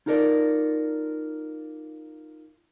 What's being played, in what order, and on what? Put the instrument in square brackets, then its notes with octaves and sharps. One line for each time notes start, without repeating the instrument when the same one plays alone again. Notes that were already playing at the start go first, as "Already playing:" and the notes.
[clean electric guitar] D#4 F4 A4 A#4 D5